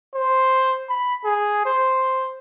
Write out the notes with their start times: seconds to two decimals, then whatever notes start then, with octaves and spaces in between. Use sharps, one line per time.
0.15 C5
0.89 B5
1.25 G#4
1.66 C5